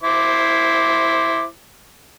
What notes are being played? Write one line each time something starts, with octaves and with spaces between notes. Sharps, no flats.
E4 C5 D6